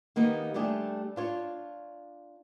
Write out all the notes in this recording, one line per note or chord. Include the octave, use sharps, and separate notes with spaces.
D#3 A#3 B3 D#4 G4
G3 A3 D4 G4 G#4
D4 F4 C#5